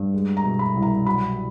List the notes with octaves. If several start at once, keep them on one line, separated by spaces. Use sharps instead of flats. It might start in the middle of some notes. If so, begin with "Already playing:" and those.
Already playing: G2
G#3
A#5
B2
B5
C2
A#5
F#3 B5